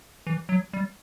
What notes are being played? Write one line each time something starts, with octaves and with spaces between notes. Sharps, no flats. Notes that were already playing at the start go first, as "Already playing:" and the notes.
E3
F#3
G3